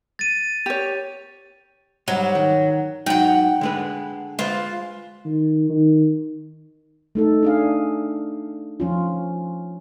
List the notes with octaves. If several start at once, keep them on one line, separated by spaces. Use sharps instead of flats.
A6 D#7
G4 C#5
G#2 F#3 G3
D#3
G#2 F#3 D#4 F#5 G5
D3 G#3 B4
G#3 F4 B4 C5
D#3
D#3
A3 D#4 A4
D4 G#4 F5
F3 C#4 F4